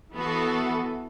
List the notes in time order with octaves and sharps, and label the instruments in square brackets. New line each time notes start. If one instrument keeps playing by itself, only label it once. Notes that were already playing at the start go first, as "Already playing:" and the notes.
[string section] E3 B3 F#4 A4